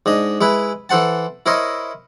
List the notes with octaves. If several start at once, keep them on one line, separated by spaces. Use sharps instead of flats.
G#2 D4 D#5
G#3 E4 B4
E3 A4 C5 F#5 A5
E4 A#4 C5 C#5 D#5